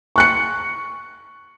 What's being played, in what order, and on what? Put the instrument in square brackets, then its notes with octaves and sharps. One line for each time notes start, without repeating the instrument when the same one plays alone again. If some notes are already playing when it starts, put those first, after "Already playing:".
[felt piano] C#6 F#6 C#7